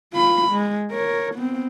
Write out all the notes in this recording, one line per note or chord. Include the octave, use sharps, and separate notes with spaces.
F4 B5
G#3
A#4 C#5
B3 C4